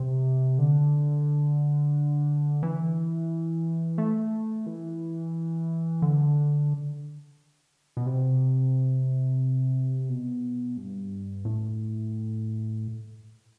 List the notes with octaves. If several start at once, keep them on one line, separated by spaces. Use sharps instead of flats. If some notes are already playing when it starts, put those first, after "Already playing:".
Already playing: C3
D3
E3
A3
E3
D3
B2
C3
B2
G2
A2